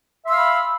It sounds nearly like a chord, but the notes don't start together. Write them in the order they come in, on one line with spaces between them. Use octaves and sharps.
E5 C6 E6 F5 B5